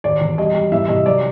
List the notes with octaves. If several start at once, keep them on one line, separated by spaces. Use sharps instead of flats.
D#2 D5
E1
G3 D#5
G3
E3 E5
C3 D#5
F#3 D5